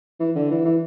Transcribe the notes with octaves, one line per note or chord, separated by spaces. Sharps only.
E3
D3
E3
E3